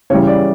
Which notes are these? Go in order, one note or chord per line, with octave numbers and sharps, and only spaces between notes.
C#3 E3 G3 C#5
D5